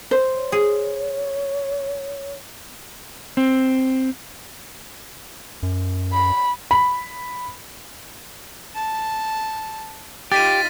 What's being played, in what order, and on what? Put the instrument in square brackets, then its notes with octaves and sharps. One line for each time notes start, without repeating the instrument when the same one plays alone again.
[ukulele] C5
[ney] C#5
[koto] G#4
[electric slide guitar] C4
[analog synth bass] F#2
[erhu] B5
[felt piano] B5
[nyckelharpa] A5
[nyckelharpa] D#4 F4 [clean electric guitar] G4 [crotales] A6 B6 D#7